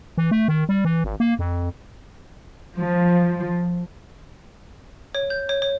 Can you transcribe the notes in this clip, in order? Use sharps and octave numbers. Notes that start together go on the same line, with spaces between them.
E3
A3
D#3
G3
E3
G#1
A#3
F2
F3
C#5
G6
C#5
C#5